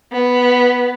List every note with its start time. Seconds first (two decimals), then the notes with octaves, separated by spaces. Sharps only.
0.12 B3